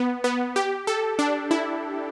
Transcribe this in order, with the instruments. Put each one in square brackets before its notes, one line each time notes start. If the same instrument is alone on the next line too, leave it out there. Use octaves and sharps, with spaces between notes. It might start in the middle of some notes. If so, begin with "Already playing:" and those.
Already playing: [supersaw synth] B3
B3
G4
A4
D4
E4